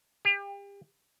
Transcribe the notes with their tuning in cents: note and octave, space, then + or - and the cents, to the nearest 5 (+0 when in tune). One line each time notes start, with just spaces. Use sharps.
G4 +35